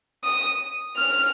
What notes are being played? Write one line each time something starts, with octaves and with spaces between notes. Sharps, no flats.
D#6
F6